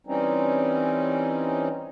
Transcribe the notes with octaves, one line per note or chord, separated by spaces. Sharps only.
E3 G3 C4 C#4 D#4